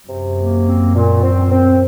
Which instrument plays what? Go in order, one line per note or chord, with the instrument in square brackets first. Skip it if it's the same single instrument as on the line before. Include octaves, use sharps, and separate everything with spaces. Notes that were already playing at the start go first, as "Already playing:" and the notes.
[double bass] F#2 [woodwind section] C3
[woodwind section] A#3
C4
A#2
C4
C4